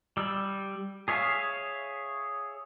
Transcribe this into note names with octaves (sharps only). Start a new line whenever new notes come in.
G3 E6
G#4 C#5 E5 F5